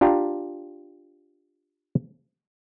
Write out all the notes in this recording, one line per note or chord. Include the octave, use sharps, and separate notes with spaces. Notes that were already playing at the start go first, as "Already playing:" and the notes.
D4 F4 G4 G5 A#5